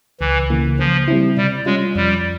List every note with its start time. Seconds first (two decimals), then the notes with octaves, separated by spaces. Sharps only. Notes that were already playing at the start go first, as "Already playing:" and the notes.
0.21 C#2 E3
0.50 C#3 E3 A#3
0.79 C#3 F3
1.08 G3 C4 E4
1.37 C3 G3
1.66 G3 G#3 C#4 F4
1.95 F2 G3